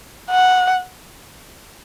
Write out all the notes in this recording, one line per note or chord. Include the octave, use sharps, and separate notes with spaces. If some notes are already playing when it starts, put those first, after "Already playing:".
F#5